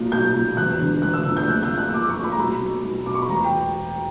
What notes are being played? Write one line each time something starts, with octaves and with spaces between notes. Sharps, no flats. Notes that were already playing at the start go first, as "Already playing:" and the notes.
Already playing: B1 A#2
B1 G6
A#2
E1 F#6
E2 D3
E1 F#6
E6
D3
E2
G6
A#1 F#6
G6
A#2
F#6
E6
A#1 D6
C#6
A#2
B5
A#5
B1 B5
B2
B1
B2 D6
C#6
B5
E1 A#5
G5